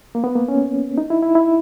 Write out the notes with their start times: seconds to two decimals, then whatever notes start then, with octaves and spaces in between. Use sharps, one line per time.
0.15 A#3
0.24 B3
0.35 A#3
0.48 C#4
0.98 D#4
1.10 E4
1.22 E4
1.35 E4